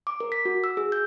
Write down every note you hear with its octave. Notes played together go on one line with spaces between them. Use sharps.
D6
A#4
B6
F#4
E6
G#4
G6